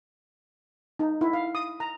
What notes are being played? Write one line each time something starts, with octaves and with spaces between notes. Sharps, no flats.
D#4
E4
F5
D#6
A#5